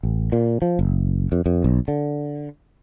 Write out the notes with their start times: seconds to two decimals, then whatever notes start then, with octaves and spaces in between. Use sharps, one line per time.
0.03 A1
0.32 A#2
0.62 F3
0.79 F#1
1.32 F2
1.46 F2
1.64 B1
1.88 D3